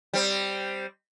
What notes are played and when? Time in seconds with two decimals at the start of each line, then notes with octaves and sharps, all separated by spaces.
0.14 G3 C4